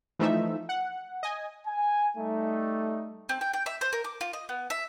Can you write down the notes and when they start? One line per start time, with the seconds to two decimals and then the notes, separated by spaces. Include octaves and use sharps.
0.19 E3 F3 A3 D#4 E5
0.69 F#5
1.23 D#5 G#5
1.66 G#5
2.17 G3 A3 D#4
3.29 C4
3.41 G5
3.54 G5
3.66 E5
3.81 C5
3.93 A#4
4.04 D6
4.21 F4
4.33 D#5
4.49 B3
4.70 E5